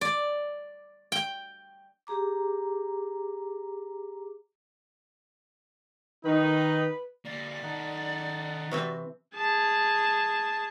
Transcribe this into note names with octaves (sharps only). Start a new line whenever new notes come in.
D5
G5
G4 G#4 A#5 D6
D#3 D#4 B4
D3 A#3 D5
D#3 D#4 A4 F#5
C3 E3 C4 F#4
G#4 A5